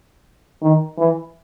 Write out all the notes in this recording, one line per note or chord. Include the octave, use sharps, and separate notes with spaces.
D#3
E3